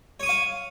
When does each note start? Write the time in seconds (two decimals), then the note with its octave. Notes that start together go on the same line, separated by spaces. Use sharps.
0.20 C#5
0.23 D#6
0.26 C#6
0.29 F5